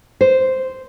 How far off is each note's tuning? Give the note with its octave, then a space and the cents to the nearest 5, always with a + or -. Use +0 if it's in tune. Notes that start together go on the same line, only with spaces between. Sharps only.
C5 -5